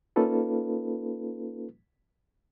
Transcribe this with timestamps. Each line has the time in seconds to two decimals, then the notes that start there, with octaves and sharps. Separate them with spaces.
0.16 A#3 C#4 D#4 F4 A4 B4